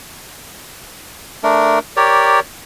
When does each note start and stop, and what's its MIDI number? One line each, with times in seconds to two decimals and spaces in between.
1.43 1.79 57
1.43 1.79 62
1.43 1.79 70
1.97 2.40 67
1.97 2.40 70
1.97 2.40 73
1.97 2.40 74